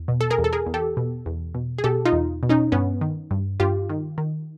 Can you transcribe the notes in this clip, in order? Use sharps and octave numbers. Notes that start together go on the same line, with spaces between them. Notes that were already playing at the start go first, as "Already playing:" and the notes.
Already playing: E2
B2
A4
G#4 A#4
E2
A4
G#4 A#4
E2
G4 A4
B2
E2
B2
G#4
B2 G4 A4
D#4 F4
E2
B2
C#4 D#4
G2 B3 C#4
D#3
G2
G2 F4 G4
D#3
D#3